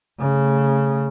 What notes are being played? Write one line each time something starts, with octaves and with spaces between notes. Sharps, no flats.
C#3 A3